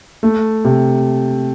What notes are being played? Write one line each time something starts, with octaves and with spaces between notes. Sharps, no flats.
A3
C3